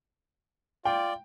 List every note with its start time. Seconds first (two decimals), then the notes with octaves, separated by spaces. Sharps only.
0.85 F4 D5 G5